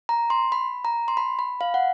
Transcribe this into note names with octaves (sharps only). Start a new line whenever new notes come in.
A#5
C6
B5
A#5
C6
B5
B5
F5
F#5